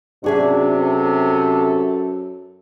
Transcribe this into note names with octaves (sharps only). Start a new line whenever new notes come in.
F#2 C3 D4 F#4 G#4 E5
A4